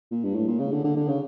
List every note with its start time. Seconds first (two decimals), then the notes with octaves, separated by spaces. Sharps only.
0.11 A#2
0.24 G2
0.35 A2
0.48 A#2
0.60 C#3
0.72 D3
0.84 D3
0.97 D3
1.08 C#3